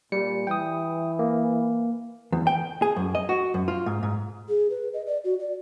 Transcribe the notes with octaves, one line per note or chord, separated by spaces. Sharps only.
A#2 G3 C#7
E3 G5 D#6
A#3
E2
G5
G#4
F#2
D#5
F#4
F#2
F4
G#2
G#2
G#4
B4
D#5
D5
F#4
D5